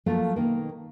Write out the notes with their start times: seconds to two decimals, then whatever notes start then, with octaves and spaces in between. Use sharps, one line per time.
0.06 F3 F#3 A3 A#3 F4 A4
0.36 B2 D#3 A#3